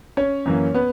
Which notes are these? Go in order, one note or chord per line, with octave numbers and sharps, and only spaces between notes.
C#4 C#5
F#2 E3 A#3
B3 B4